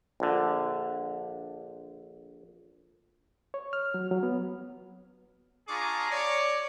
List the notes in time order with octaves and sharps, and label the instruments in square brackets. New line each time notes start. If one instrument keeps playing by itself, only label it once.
[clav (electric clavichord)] A#1 D3
[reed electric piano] C#5
F6
F#3
F#3
B3
[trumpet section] D4 F4 G#4 A#5 C#6 D6
C#5 D5